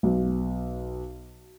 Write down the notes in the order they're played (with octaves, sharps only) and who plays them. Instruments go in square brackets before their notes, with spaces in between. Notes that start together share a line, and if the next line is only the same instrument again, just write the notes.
[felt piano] B1